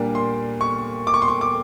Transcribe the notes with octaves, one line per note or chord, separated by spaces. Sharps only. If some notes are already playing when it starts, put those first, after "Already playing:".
Already playing: A#2 G3 A#3 D4
C6
C#6
D6
C#6
C6
C#6
D6